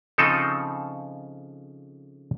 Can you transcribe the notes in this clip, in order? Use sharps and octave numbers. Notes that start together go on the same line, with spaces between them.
C#3 F3 C4 D#4 A4